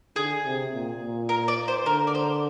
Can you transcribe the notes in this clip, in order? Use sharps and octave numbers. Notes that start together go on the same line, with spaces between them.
D3 G#4
C3
A#2
A#2
A#4
D5
C5
D3 A#4
D5
C5